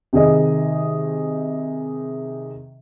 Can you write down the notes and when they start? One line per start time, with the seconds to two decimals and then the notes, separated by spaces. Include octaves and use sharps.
0.13 C3 D#3 G#4 D#5